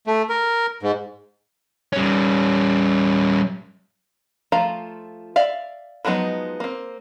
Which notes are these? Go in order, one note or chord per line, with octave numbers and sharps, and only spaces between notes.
A3
A#4
G#2
G3 C#4
F3 A3 F4 F5 A#5
D5 E5 F5
F3 F#3 G#3 B3 D#4
A#3 C4